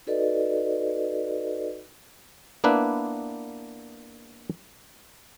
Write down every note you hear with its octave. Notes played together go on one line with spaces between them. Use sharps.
D#4 F#4 A4 B4 D5 D#5
A#3 B3 D4 E4 B4